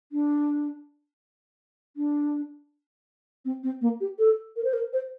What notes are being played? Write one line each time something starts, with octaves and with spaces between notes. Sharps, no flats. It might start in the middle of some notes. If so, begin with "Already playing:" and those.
D4
D4
C4
C4
A#3
G4
A4
A#4
C5
A#4
C5